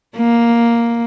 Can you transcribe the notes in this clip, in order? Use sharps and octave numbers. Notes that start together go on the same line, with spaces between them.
A#3